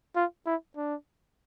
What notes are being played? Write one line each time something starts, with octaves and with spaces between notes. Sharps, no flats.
F4
E4
D4